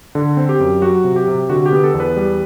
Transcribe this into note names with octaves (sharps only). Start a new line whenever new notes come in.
D3
C4
G4
F#2
F#3 F#4
C3
G4
C3
D3 F#4
G4
B3
A4
E2
B4
G3